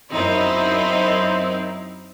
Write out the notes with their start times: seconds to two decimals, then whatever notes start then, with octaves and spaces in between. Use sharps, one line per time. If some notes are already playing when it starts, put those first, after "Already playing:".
0.13 F#2 C4 D#4 E4